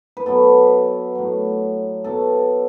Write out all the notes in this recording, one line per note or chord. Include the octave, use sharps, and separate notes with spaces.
B4
B2 F#3 A4
A2 F#3
B2 F#3 A4